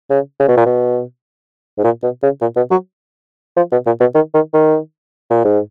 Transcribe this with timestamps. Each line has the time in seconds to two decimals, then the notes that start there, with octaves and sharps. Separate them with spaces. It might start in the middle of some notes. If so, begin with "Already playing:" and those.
0.10 C#3
0.40 C#3
0.48 B2
0.57 A#2
0.66 B2
1.78 G#2
1.84 A#2
2.03 B2
2.23 C#3
2.41 A#2
2.56 B2
2.71 F#3
3.57 F3
3.72 B2
3.86 A#2
4.00 B2
4.15 D#3
4.34 D#3
4.54 D#3
5.31 A#2
5.45 G#2